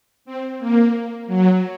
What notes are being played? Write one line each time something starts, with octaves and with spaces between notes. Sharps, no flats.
C4
A#3
F#3